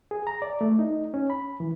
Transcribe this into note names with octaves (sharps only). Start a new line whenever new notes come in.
G#4
A#5
D5
A3
D#4
C#4
B5
E3